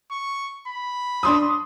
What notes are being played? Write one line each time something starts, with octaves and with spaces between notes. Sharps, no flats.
C#6
B5
D4 C6 D#6